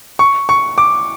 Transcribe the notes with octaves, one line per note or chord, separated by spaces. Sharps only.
C#6
C#6
D6